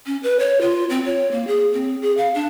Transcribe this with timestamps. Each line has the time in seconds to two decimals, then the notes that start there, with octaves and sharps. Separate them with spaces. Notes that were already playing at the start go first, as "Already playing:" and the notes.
0.06 C#4
0.23 B4
0.39 C#5
0.61 F4
0.90 C4
1.05 C#5
1.32 A#3
1.47 G#4
1.73 C4
2.02 G#4
2.17 F5
2.35 D4